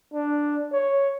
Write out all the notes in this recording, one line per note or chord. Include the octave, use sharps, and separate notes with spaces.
D4
C#5